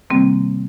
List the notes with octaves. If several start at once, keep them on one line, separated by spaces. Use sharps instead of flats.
C3 D#3 G3 A#3 C4